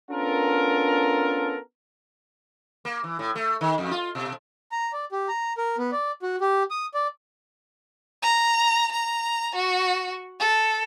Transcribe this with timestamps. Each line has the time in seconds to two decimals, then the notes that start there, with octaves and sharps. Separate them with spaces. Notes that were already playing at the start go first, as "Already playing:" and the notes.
0.11 B3 C#4 D4 F4 A4 A#4
2.85 A#3
3.04 E3
3.19 A2
3.36 A3
3.61 D#3
3.78 F2
3.91 F4
4.15 B2
4.72 A#5
4.93 D5
5.12 G4
5.28 A#5
5.58 A#4
5.78 B3
5.92 D5
6.22 F#4
6.41 G4
6.71 D#6
6.94 D5
8.23 A#5
8.92 A#5
9.55 F#4
10.40 A4